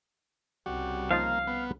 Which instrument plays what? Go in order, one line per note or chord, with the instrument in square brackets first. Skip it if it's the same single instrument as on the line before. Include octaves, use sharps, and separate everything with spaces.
[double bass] C2 C#3 [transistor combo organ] G3 F#4
[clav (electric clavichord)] F3 D#4 F4 [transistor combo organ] A#3 [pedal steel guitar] F5
[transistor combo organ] B3